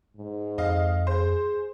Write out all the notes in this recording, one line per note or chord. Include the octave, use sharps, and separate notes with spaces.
G#2
F2 D#5 F5
G#4 C5